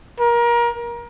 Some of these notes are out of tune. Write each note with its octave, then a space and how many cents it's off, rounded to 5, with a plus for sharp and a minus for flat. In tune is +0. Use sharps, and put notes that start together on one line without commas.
A#4 +25